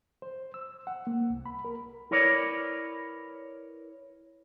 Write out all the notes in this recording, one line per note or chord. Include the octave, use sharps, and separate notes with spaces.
C5
E6
F#5
A#3
C2
B5
A#4
E4 A#4 B4 C#5 D5